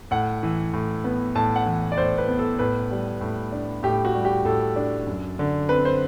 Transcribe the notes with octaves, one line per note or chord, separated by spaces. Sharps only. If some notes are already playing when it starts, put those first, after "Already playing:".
A2 F#5
E3
A2
B3
A2 A5
F#5
E3
D5
A2 C5
B4
B3
A4
A2 B4
G3
A2
D4
A2 G4
F#4
G3
G4
A2 A4
D4
F#2
D3
C4 B4
C5